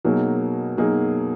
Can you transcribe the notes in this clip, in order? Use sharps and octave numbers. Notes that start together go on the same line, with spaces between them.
B2 F#3 A#3 D#4 G#4
B2 F#3 A#3 D#4 G#4